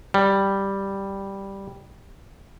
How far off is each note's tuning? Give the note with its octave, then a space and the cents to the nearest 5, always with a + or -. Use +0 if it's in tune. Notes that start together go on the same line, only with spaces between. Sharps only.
G3 +0